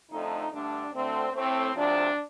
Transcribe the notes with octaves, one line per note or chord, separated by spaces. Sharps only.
F2 D3 A3 D#4
G2 D3 A3 D4
D2 D3 A3 C4
A2 A3 C4
D2 C3 F3 D4